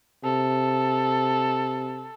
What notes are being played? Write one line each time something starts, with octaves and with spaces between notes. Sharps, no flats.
C3 A4